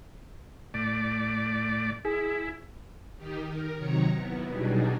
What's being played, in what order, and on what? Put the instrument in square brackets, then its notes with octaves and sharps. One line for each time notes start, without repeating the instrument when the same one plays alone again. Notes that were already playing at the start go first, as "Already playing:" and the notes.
[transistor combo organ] A2 D5
[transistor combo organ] E4 [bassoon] G#4
[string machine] D#3 D#4 G4
A#4
C3 D#3 F#3 C#5 A#5 C#6
B3 E4
B2 F#3 G3 D4 D#4 G#4